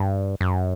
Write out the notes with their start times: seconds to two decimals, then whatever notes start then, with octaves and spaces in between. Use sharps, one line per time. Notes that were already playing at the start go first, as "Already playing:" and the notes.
Already playing: G2
0.41 F#2